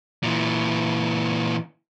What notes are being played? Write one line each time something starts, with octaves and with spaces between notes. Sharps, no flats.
A#2 E3